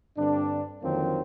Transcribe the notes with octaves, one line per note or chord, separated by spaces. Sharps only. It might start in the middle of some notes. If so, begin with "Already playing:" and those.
G2 D3 C4 D4
F2 D3 D#3 F#3 A#3 C4